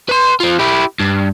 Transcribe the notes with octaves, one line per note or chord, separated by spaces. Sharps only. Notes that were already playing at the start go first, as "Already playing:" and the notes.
B4 C6
C4 F4
E4 G4
G2